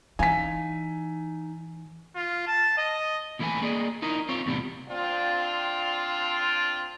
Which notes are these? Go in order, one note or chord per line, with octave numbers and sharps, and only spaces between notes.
E3 D#4 F5 G#5 B6
F4
A5
D#5
D#2 E3 A3 E4 B4 G#5
A#3 G#4 D5 D#5
D#4 E4 A#4 D#5
C4 F4 C#5
E2 A2 C3 G3
C4 D4 F4